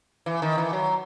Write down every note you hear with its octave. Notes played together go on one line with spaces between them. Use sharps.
E3
D#3
E3
F#3